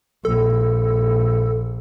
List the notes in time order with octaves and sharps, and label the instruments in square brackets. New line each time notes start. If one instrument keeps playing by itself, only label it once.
[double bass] A#1 [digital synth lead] A4